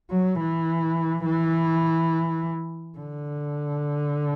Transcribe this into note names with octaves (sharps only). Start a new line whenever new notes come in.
F#3
E3
E3
D3